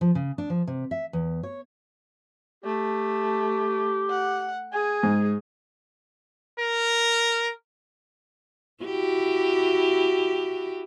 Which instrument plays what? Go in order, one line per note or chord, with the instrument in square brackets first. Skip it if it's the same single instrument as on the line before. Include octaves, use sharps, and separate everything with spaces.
[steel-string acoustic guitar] F3
C#3
D4
F3
C3
E5
E2
C#5
[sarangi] A3 [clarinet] G4
[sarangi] F#5
[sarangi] G#4 [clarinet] G#5
[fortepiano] G#2
[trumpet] A#4
[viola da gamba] E4 F#4 G4